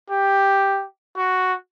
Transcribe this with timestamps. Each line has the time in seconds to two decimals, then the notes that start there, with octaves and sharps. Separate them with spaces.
0.10 G4
1.16 F#4